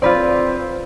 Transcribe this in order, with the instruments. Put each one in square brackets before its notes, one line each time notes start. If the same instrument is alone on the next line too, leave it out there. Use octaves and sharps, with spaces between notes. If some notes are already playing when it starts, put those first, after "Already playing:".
[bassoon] C4 [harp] F4 B4 D5